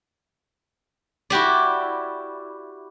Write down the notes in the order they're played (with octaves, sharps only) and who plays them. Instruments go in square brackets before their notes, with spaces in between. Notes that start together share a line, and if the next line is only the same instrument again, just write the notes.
[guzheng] E4 F#4 G4 D5